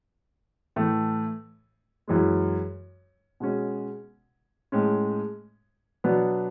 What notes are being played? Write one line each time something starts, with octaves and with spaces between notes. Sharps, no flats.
A2 E3 A3
F#2 E3 G#3
B2 G#3 C#4
A2 G#3 C#4
B2 F#3 B3 D4